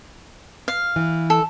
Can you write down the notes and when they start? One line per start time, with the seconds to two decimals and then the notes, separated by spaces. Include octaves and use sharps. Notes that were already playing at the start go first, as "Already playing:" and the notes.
0.68 F5
0.96 E3
1.30 A4